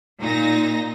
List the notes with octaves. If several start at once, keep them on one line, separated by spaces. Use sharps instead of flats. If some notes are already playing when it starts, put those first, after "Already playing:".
A#2 D#4 A#6